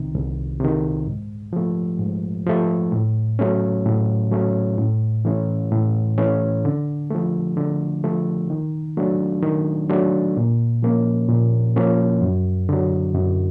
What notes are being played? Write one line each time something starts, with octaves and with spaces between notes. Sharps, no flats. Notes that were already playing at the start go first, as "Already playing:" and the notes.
Already playing: C2 C3 D#3
C2
C3 D#3
G#2
F3 A3
G#2
F3 A3
A2
F#3 A3 C#4
A2
F#3 A3 C#4
A2
E3 A3 C#4
A2
E3 A3 C#4
D3
F3 A3
D3
F3 A3
D#3
F#3 A3 D4
D#3
F#3 A3 D4
A#2
F3 A#3 C#4
A#2
F3 A#3 C#4
F#2
D3 F#3
F#2